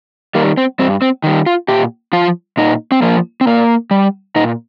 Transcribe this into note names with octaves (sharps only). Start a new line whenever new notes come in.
D#3 G3 A#3
C4
G2 C4
C4
D#3 G3
F4
A#2 G4
F3 F4
A#2 D#4
C4
F3 A#3
C4
A#2 A#3
G3
A#2 D#4